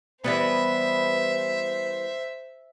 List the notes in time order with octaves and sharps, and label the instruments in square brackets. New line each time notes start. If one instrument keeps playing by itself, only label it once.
[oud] E3 G3 B3 [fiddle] C5 E5